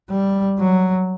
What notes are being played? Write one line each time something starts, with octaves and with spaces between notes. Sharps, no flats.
G3
F#3